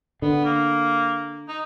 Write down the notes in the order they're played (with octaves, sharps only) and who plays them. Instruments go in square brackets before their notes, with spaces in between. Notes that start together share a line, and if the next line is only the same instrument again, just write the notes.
[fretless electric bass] D3 [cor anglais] B3
[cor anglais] A#3
D#4